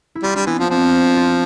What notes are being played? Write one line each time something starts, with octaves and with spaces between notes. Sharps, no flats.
E4
G3 F4
G3 D4
E3 B3
F3 C4
F3 D4
F4